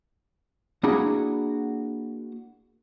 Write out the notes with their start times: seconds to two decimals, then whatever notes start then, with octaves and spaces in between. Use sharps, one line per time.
0.83 A#3 D4 E4 F#4 G#4 A#5